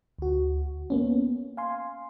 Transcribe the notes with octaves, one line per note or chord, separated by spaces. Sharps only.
D2 F#4
A#3 B3 C#4
F5 G#5 C6